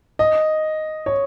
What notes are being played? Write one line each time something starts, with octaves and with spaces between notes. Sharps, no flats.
D#5
C#5